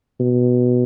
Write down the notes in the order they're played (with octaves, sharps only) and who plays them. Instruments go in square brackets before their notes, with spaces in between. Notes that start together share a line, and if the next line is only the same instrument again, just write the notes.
[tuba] B2